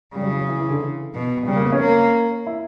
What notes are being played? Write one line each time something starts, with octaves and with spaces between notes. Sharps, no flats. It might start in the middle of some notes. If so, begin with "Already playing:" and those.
C#3 G3
F#3
E3
F#3
E3
E3
D3
E3
B2
C#3 G3
A#3
B3
C#4
A#3
E4